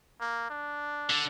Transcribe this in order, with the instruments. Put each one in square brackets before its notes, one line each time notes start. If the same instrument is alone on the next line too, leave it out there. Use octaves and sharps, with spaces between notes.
[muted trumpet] A#3
D4
[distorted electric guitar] D3